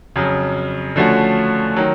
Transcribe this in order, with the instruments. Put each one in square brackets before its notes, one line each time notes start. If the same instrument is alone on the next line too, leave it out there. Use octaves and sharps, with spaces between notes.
[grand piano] F2 C#3 F#3
D3 F3 A3 C#4 F#4
D#3 F#3